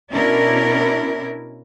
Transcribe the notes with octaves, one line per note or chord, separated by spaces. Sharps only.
B2 C#4 D4 E4 A#4